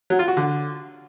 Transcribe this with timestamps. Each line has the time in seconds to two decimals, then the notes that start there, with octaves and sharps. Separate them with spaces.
0.10 F#3
0.19 F4
0.28 F#4
0.37 D3